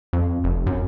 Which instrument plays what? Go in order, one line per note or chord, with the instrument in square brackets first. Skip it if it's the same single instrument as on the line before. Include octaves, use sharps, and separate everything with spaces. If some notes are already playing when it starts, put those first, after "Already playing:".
[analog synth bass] F2
F1
F#2